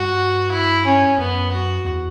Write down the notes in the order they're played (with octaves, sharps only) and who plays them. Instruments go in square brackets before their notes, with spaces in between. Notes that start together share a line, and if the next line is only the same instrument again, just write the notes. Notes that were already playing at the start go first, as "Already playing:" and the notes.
Already playing: [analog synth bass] G2 [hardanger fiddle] F#4
[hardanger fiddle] E4
C#4
[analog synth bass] F#2 [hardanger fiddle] B3
[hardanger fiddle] F#4
[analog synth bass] E2